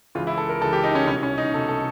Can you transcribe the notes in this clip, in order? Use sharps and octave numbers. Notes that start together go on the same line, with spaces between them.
C#2 C#3 E3 F4
E4
A4
A#4
C#2 C#3 E3 A4
G4
D#4
C#4
C2 B2 C#4
C#4
D#4
C2 B2 A4
A4